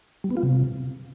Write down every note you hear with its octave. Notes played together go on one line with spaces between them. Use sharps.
G3
B3
F4
C3